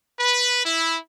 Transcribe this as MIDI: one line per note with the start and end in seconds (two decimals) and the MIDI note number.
0.19 0.63 71
0.65 0.97 64